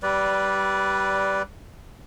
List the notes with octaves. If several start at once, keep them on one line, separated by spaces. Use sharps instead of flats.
G3 B4 D5